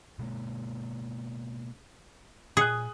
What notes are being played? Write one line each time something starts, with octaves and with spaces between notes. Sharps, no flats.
B2 G#3 A#3
A#2 G#4 D#6 F#6